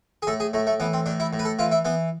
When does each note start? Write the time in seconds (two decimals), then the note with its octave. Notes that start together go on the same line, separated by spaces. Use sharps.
0.22 G#4
0.27 A2 A4
0.40 G#4
0.53 A2 A3
0.67 A3
0.80 E3 B3
0.93 C4
1.06 A2 D4
1.20 E4
1.33 A2
1.39 B4
1.45 A4
1.59 E3 F4
1.71 E4
1.85 E3 B3